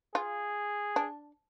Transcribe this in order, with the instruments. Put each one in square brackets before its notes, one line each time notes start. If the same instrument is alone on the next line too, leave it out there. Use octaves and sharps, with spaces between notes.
[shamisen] F4 [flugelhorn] G#4
[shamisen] D4